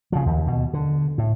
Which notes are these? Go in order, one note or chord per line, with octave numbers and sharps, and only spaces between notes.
C#3 F3
D#2
B2
D3
A2